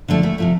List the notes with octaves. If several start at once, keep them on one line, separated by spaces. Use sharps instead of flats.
D3 F3 A3
D2 A3
C3 F3 A3